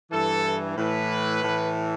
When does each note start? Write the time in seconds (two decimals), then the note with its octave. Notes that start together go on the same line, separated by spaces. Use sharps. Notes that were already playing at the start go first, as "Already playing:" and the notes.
0.10 G2 E3 A4
0.76 A2 E3 B4
1.43 A2 E3